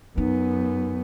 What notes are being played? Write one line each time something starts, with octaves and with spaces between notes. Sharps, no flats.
F#2 B3 D#4